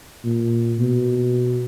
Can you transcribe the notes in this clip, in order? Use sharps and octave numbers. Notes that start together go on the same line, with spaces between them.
A#2
B2